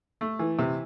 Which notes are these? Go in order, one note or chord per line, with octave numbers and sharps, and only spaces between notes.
A3
E3
C3